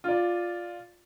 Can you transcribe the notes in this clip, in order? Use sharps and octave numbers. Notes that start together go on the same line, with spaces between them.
F4 D5